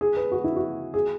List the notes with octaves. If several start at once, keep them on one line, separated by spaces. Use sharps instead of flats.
G#4
B4
F#4
E4
F#4
G#4